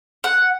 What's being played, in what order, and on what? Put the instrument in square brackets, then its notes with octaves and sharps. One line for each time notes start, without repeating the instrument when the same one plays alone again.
[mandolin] F#5